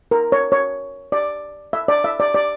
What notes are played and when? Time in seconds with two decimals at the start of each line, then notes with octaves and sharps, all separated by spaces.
0.11 A#4
0.32 C#5
0.52 C#5
1.12 D5
1.73 E5
1.88 D5
2.04 E5
2.20 D5
2.35 D5